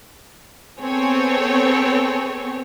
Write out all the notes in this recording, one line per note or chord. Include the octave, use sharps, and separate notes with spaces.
B3 C4 G#4 A4 C#5